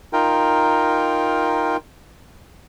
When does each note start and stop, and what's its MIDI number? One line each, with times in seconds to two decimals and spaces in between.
0.13 1.77 63
0.13 1.77 65
0.13 1.77 70
0.13 1.77 79